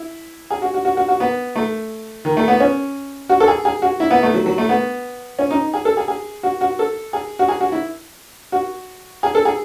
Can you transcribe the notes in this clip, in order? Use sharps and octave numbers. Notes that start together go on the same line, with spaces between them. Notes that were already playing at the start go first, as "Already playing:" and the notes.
Already playing: E4
G#4
F#4
F#4
F#4
F#4
F#4
B3
A3
D#3
A3
B3
C#4
F#4
A4
G#4
G#4
F#4
E4
B3
A3
F#3
F#3
A3
B3
C#4
D#4
G#4
A4
G#4
G#4
F#4
F#4
A4
G#4
F#4
G#4
F#4
E4
F#4
G#4
A4
G#4